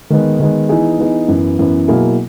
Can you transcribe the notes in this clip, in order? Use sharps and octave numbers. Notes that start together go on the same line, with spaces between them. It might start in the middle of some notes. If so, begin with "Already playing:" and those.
D#3 G#3 B3
D#3 G#3 B3
E3 B3 D#4 G#4
E3 B3 D#4 G#4
F#2 E3 B3
F#2 E3 B3
B2 F#3 A#3 E4 G#4